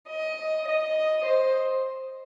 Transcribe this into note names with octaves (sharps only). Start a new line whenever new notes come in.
D#5
D#5
C5